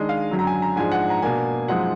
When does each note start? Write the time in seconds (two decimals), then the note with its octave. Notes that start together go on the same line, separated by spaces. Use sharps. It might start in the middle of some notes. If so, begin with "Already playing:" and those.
Already playing: D#3 G#3 D4 D#5
0.09 F5
0.31 F#2 D3 F#3
0.39 A#5
0.47 G#5
0.62 A#5
0.76 G#2 F3 G#3 D4 G#5
0.92 F#5
1.10 A#5
1.22 B2 A#3 D4 G#5
1.68 F#2 F3 G#3 D#4 F#5